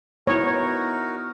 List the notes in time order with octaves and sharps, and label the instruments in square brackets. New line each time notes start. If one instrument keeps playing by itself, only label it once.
[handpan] B3 E4 [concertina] D#4 F#4 A#4 [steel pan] C#5